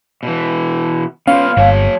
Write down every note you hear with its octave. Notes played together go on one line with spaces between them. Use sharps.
B2 E3
B3 C#4 E4 F4 F5
G1 F#3 C#5 A5